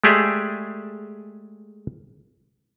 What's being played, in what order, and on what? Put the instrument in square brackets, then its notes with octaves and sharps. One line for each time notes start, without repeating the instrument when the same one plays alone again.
[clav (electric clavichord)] G#3 A3 G4 G#4 D5 E5